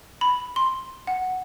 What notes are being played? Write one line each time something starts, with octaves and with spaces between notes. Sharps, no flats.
B5
C6
F#5